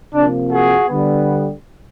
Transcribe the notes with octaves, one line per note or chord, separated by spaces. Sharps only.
C3 F3 A#3 D4
F#4 G#4
D3 G3 B3